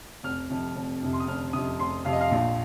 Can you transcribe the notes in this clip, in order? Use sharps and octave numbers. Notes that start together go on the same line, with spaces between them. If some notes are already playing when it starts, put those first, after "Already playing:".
F1 F6
F2 C3
F1
F2 C3
C6
D#6
F1 F6
F2 C3 D#6
F1 C6
F2 C3 F5
D#5
F5
A#1